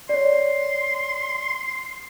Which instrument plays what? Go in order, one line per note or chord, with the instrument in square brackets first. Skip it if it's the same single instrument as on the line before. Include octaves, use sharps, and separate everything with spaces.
[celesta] C#5 D5 [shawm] C6